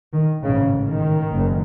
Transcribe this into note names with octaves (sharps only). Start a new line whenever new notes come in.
D#3
A1 G#2 C#3
D#3
F#1 F#2